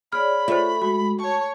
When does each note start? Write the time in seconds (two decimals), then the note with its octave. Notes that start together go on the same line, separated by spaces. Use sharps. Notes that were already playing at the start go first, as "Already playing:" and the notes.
0.12 G#4 C#5 D5 B5 F6
0.48 A3 F4 C5
0.82 G#3 F#4
1.20 C#5 A5 C#6